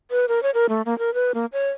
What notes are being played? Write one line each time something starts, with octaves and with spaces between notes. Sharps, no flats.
B4
A#4
C#5
A#4
A3
A#3
A#4
B4
A#3
C#5